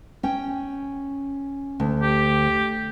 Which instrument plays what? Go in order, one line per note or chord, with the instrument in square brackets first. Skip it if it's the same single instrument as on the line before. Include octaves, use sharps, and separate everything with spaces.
[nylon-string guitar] C#4 G5
D2
[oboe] G4